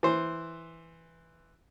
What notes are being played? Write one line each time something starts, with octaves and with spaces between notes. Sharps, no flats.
E3 C5